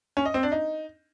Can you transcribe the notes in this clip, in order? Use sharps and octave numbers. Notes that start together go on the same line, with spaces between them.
C#4
D#5
C4
D4
D#4